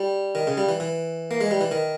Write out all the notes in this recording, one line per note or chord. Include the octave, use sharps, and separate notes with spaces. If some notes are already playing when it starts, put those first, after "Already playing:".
Already playing: G3
D#3
C#3
G3
E3
E3
A#3
G#3
G3
E3
D#3